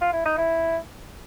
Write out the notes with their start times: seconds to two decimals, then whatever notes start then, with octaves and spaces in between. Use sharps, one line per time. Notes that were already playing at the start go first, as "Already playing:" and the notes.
0.01 F4
0.13 E4
0.25 D#4
0.38 E4